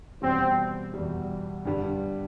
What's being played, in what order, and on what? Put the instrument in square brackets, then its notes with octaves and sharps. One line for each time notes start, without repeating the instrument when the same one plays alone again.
[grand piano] E2 B2 G3 [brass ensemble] C4
[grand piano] E2 B2 G3
G2 D3 G3